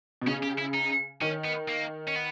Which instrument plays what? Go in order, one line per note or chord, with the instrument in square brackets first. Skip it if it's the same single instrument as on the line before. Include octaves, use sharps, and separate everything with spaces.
[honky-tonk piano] B2
[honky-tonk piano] C#3 [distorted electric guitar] C#4
[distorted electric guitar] G4
E4
D#4
[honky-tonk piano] D#3 [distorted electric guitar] C#4
[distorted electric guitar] B3
A#3
C#4
B3